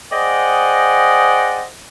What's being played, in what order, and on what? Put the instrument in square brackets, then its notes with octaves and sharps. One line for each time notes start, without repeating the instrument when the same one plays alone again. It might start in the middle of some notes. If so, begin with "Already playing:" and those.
[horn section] G#4 C5 D5 D#5 F#5 G5